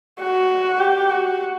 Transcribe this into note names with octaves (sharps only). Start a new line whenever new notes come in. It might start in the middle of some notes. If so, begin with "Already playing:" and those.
F#4
G4
F#4